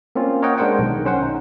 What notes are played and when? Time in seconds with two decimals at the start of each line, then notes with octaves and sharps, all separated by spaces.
0.16 A#3 C4 C#4 F4
0.42 A#4 C#5 D#5 F#5 G5
0.58 G#3 D4 A#4 C5 F#5 G5
0.79 B1 D#3
1.05 C#4 C5 F#5
1.22 D#4